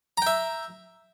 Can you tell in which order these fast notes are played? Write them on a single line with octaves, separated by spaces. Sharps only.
A#5 G5 E5